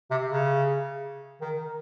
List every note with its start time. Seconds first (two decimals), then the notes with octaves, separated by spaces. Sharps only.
0.11 C3
0.29 C#3
1.41 D#3